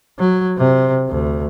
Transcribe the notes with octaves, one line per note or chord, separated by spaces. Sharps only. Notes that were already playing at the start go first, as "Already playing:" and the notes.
F#3
C3
D2